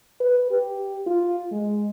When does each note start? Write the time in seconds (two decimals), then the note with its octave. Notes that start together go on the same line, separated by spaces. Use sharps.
0.20 B4
0.51 G4
1.06 F4
1.51 G#3